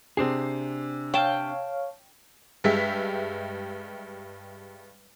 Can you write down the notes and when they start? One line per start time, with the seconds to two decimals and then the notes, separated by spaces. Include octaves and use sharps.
0.17 C3 C4 D4 G#4 C7
1.14 C#5 F5 G5 A5
2.64 G2 G#3 G4 E5 B6